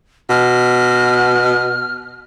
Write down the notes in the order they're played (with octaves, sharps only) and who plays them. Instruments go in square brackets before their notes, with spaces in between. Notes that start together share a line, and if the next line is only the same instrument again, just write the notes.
[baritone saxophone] B2 [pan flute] F6